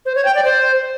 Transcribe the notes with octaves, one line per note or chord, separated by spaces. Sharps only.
C5
C#5
G5
D5
C5